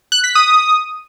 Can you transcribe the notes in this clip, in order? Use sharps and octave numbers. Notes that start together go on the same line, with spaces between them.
F#6
B6
D#6